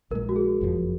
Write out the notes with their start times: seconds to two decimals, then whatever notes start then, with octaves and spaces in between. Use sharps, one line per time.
0.10 A#1 A#2 G#3 A#4
0.29 F#4
0.36 G#4
0.61 F#1 F2 C3 F3